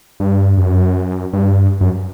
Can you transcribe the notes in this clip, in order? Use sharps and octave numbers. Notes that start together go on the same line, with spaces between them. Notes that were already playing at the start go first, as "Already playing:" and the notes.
G2
F#2
G2
F#2